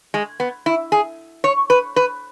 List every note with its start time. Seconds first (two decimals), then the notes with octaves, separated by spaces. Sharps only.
0.14 G#3
0.40 B3
0.66 E4
0.92 G#4
1.44 C#5
1.70 B4
1.96 B4